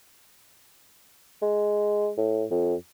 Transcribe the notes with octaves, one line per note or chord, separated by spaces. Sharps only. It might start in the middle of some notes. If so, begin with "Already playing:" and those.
G#3
A2
F2